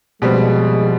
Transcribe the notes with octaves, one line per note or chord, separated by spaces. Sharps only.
B2 F3 G3 G#3 C4